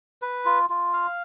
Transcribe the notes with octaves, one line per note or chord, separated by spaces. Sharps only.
B4
F4
F4
F5